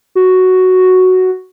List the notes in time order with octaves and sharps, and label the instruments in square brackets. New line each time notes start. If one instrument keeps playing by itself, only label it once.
[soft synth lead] F#4